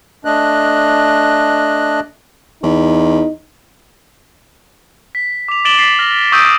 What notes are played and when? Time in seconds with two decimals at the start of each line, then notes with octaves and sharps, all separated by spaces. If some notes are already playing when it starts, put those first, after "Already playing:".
0.25 A3 D4 D#5 F#6
2.63 E2 D#4
5.15 B6
5.48 D6 F7
5.65 D6 A6 D7 E7 F#7 G7
5.78 A6 B6 C7 F#7
5.99 F6 A#6
6.32 C#6 D#6 E6 G6 D7 D#7